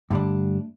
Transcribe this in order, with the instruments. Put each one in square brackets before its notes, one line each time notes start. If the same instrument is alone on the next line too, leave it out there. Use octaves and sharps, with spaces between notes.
[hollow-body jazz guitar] G2 D3 G3 D4 [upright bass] A3